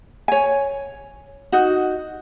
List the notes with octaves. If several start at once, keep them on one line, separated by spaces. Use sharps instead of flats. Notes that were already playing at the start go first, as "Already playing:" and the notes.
C#5 G#5
D#4 F#4